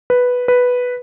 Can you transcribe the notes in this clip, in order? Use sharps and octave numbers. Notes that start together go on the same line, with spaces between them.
B4
B4